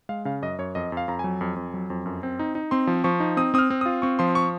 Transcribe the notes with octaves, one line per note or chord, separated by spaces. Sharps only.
G#3 F5
C#3 F5
F#2 D#5
F#2 C#5
F2 D#5
F2
F5
F2 A#5
F#3 G#5
F2
F2
F#3
F2
F#2
C4
D#4
D#4
C4 C6
F3
F3 C#6
D#4
C4 D#6
C4 D#6 F6
C4
F4 D#6
C4 C#6
F3 C6
C#6